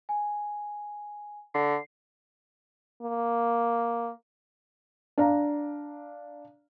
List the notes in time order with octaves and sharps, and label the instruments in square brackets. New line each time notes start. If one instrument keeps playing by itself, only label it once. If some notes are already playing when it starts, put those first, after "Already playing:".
[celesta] G#5
[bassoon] D3 [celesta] C7
[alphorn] A#3
[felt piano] D4 F5 A#5